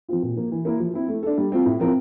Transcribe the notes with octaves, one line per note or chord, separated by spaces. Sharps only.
F3 C4 F4
A#2
F3 A#3
E3
A#3 E4 A#4
F3
C4 E4
A3
D4 A4
G3
C4 F4
A2
F3 C4 F4 A#4